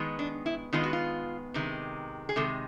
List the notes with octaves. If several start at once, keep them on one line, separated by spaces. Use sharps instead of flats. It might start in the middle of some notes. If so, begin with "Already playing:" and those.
Already playing: D#3 G#3 B3
D4
E4
D#3 G#3 B3 F4
F#4
F4
C3 D#3 G#3
G#4
C3 D#3 G#3 A4